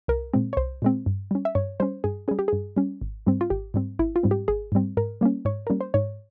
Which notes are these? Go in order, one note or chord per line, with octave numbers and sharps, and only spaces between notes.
C2 A#4
A#2 G#3 C4
C#5
C2 C5
A#2 G#3 C4
G2
G3 C#4
E5
G2 C#5
G3 C#4 C5
G2 G#4
G3 C#4 G#4
G4
G2 G#4
G3 C#4
G#1
G#2 G3 C4
F4
G#1 G4
G#2 G3 C4
G#1 E4
F4
G#2 G3 C4
G4
G#1 G#4
G#2 G3 C4
G#2 A#4
G3 A#3 C#4
G#2 C#5
G3 A#3 C#4 A#4
C5
G#2 C#5